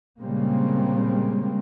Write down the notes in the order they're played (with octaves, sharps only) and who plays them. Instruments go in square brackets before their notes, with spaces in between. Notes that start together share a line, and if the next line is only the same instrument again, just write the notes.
[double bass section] A#2 C#3 G3 G#3 A#3 C4